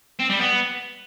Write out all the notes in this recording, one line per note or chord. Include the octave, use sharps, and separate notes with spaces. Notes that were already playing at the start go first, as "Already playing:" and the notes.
C4
G3
B3